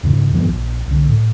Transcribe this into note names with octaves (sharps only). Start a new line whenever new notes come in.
D#2 G#2 C#3
G2 D#3 F3 B3
A#1
C2 D3
A2